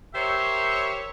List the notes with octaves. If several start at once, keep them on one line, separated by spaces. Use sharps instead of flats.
G4 A#4 C5 C#5 E5